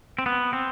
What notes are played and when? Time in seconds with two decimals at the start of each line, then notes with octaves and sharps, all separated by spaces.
0.19 C4
0.26 B3
0.53 C4